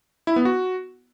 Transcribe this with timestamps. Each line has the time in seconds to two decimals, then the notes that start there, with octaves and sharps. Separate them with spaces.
0.27 E4
0.36 B3
0.45 F#4